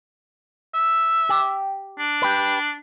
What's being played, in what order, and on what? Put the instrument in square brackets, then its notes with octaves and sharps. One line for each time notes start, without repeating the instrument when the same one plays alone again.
[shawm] E5
[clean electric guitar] G4
[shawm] D4
[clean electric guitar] G4 B4